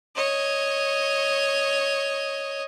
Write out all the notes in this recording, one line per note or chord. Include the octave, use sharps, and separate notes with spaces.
C#5 D#5